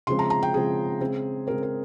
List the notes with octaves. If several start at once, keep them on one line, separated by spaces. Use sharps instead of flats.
C#3 F3 G#3 C4 C6
A#5
A#5
G5
C#3 F3 G#3 C4 G#4
C#3 G#3 C4
C#3 G#3 C4 A#4
A#4